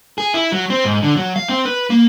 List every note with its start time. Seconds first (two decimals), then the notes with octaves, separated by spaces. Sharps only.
0.18 G#4
0.34 E4
0.52 F#3
0.70 C4
0.84 G#2
1.03 D3
1.17 F#3
1.36 F5
1.49 C4
1.65 B4
1.90 A#3